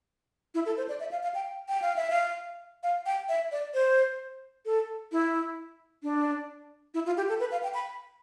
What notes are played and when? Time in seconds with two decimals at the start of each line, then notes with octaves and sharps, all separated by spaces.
0.55 E4
0.66 A4
0.77 C5
0.89 D5
1.00 E5
1.11 F5
1.23 F5
1.35 G5
1.69 G5
1.82 F5
1.96 E5
2.10 F5
2.83 F5
3.06 G5
3.29 E5
3.52 D5
3.74 C5
4.66 A4
5.12 E4
6.03 D4
6.94 E4
7.06 F4
7.17 G4
7.29 A4
7.40 B4
7.51 F5
7.63 G5
7.74 B5